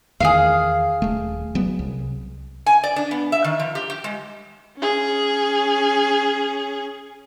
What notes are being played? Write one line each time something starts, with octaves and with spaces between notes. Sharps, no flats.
E2 D#3 G#4 F5
D#1 A3
F#3 G3 B3
C2
G#5
D5
D4
B3
E5
D#3
F3
G4
G4
G#3
C#4 G#4